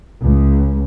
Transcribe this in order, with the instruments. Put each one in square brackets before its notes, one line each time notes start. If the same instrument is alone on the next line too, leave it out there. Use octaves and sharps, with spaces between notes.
[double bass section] C#2